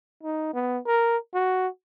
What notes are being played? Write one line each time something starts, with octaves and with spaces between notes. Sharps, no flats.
D#4
B3
A#4
F#4